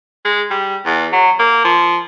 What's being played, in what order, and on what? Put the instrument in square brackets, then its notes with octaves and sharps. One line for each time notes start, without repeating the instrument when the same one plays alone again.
[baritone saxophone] G#3
G3
E2
F#3
A#3
F3